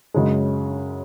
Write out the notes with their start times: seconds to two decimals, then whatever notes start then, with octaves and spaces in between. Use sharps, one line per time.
0.14 F#2 C#3 G#3